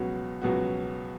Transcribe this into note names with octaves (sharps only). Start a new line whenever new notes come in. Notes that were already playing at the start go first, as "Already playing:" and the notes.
Already playing: C#2 B2 F#3 B3 F#4
C#2 B2 F#3 B3 F#4